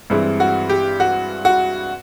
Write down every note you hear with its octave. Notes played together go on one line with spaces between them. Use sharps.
G2 E3 G#3 C4
F#4
G4
F#4
F#4